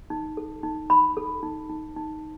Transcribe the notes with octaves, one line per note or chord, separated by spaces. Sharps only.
D#4
A4
D#4
D#4 B5
A4
D#4
D#4
D#4